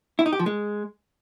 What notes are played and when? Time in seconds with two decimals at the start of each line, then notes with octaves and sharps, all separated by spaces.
0.19 E4
0.26 D#4
0.33 G4
0.39 F3
0.46 G#3